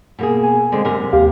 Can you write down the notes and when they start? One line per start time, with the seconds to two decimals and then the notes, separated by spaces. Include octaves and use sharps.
0.19 B2 A#3 G#4
0.43 G#5
0.72 D3 G#3 C4
0.85 F#2 C3 A#4
1.12 D#2 G4 F5